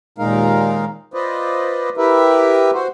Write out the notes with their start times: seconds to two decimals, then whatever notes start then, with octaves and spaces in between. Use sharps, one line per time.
0.18 D#2 A#2 G#3 D#4 A#4 F5
1.14 F4 B4 C5 D5 D#5
1.97 E4 G4 A#4 B4 E5
2.74 F#4 C5